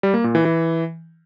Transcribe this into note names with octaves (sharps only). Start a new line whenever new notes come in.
G3
A#3
A#2
E3
E3